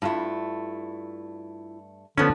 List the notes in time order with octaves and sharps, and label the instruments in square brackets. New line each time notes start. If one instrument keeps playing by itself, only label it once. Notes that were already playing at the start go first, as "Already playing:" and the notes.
[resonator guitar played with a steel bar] G2 A3 [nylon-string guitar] E4 F4 A5
[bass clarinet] D3 [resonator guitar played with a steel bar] F3 D4 [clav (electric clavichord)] B3 C#4